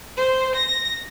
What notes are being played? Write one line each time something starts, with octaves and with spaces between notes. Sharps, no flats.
C5
A#6